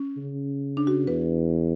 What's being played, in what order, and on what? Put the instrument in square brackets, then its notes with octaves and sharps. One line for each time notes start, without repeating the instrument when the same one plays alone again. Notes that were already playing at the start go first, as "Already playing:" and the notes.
Already playing: [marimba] C#4
[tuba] C#3
[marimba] D4
F#4
[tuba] E2 [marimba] B4